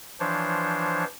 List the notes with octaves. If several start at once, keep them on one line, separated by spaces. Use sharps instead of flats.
E3 F3 D4 C5 C#5